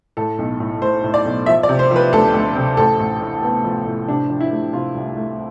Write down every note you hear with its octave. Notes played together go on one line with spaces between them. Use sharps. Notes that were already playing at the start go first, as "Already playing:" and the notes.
A2 A4
B1
A2
A2 C5
A2
D5
B1
F3 E5
D5
C3
C5
F3 B4
D2 A4
D2
C3
A1 A4
A1
A2
B3
F3
A2
C3 D4
F3
E4
A3
C3 F4
C2
A3